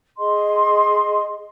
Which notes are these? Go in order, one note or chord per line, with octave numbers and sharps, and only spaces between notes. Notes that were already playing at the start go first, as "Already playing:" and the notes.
G#4 D#5 C6